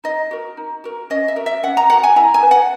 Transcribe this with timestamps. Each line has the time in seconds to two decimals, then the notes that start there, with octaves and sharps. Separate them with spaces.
0.04 D#4 D#5
0.31 F#4 A#4
0.57 D#4
0.84 F#4 A#4
1.10 C#4 D#5
1.28 E5
1.36 F#4 A#4
1.46 E5
1.63 C#4 F#5
1.77 A#5
1.90 F#4 A#4 F#5
2.03 G#5
2.16 E4 A#5
2.34 G#5
2.43 B4
2.51 F#5